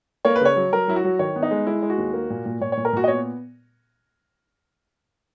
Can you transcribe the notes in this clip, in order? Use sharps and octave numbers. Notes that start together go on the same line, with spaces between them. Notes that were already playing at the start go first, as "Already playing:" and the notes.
A#3 C#5
B4
C#3 C#5
F#3
F#3 A#4
F#3 E4
F#4
F#3
D#3 C#5
B3
D#4
G#3
G#3 E4
G#3
F#4
D#2
A#3
A#2
A#2
A#2 C#5
C#5
A#2
A#4
A#2 F#4
D#5
B3 C#5